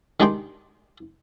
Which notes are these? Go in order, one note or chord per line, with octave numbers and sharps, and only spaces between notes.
D#3 G#3 D4 G4 G5 C6